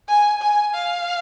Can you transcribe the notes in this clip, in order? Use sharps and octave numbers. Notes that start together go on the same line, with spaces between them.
G#5
G#5
F5